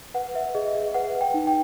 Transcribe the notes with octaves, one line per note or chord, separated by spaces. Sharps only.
B4 F#5
B4 E5
G#4 D#5
G#4 E5
B4 F#5
B4
G5
D#4
G5